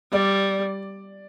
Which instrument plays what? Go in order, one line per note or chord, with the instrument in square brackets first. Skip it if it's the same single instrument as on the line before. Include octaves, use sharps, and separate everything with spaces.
[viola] G3 [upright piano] D5